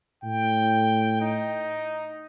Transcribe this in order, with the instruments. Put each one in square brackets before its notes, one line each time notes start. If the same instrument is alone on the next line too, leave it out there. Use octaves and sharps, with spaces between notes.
[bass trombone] A2 [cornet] G5
[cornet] D#4